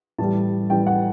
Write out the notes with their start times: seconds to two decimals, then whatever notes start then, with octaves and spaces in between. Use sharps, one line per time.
0.18 A2 E3 G3 A5
0.69 A2 E3 G3 G5
0.87 F#5